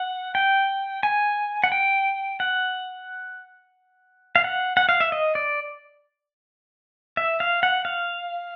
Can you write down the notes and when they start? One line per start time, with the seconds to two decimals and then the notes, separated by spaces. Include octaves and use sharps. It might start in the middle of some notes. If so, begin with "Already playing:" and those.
Already playing: F#5
0.35 G5
1.03 G#5
1.64 F#5
1.72 G5
2.40 F#5
4.36 F5
4.44 F#5
4.77 F#5
4.89 F5
5.00 E5
5.12 D#5
5.35 D5
7.17 E5
7.40 F5
7.63 F#5
7.85 F5